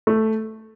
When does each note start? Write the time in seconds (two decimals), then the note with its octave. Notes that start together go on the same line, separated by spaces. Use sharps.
0.07 A3